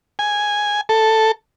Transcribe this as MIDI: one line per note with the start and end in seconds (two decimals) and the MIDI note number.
0.19 0.81 80
0.89 1.32 69